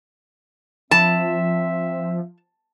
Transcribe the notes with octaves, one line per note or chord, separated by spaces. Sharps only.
F3 C4 E5 A5